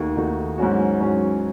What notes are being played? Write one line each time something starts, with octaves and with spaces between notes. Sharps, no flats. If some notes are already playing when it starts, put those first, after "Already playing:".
Already playing: D#2 D#3 A3 D#4 F#4
D#2 D#3 A3 D#4 F#4
G#2 F#3 C#4 F#4
G#2 F#3 C#4 F#4